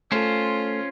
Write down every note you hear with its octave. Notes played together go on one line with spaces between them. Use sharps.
A3 C#4 F4 A4 C5